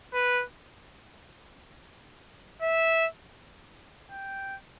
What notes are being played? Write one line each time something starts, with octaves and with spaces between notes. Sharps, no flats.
B4
E5
G5